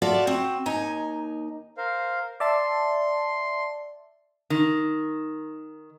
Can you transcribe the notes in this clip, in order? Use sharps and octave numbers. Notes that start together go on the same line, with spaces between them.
F4 F#4 A4 D5 E5
C4 F#4
D#2 D#4 G#5 A#5
A#4 C5 F5
D5 E5 A5 C6
D#3